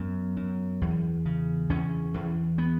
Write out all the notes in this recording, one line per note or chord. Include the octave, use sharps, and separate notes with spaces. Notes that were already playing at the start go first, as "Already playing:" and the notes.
Already playing: F#2 B3
F#2
E2
C#3
E2 C#4
E2
B3